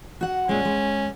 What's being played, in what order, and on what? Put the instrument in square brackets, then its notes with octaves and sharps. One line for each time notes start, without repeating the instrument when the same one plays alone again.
[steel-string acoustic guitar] F#4 F#5
[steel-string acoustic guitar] A#2 G#3 [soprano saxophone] C#4
[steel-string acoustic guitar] G#3